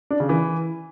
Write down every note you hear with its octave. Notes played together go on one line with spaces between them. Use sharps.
D4
C#3
E3